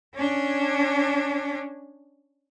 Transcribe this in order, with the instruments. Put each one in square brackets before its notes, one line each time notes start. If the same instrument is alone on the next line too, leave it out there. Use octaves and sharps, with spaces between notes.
[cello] C#4 D4